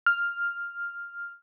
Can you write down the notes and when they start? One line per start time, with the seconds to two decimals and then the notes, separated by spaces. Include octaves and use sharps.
0.06 F6